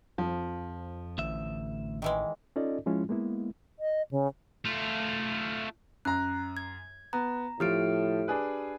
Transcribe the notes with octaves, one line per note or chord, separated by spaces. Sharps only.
F2 F3
A1 D2 E5
D#3 E3 G#3
C#4 D#4 F4 A4 D5 D#5
F3 G#3 C#4 E4 F4
G#3 A#3 B3 E4
D#5
C#3
A3 F4
F#2 A#5 F#6
G#6
B3 A#5
A2 F3 G4 F6 D7
D4 G#4 B4